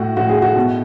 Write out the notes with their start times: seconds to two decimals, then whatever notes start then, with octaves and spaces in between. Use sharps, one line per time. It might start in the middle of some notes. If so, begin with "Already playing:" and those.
Already playing: A2 F#4
0.17 A2 F#4
0.29 G#4
0.42 F#4
0.56 B2